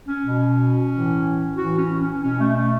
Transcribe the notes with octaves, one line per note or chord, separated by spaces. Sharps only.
C#4
B2
A2 E3
A2 E3 F#4
C#4
C#4
B2 C#4
A3
A3